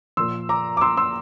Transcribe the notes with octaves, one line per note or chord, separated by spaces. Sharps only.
A#2 F3 C6 E6
A#5 D6
D6
C6 E6
C6 E6